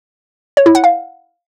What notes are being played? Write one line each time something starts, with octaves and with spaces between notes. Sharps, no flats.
C#5
E4
F#5
F5